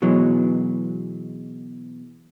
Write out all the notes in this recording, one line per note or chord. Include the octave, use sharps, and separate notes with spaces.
B2 E3 F#3 G#3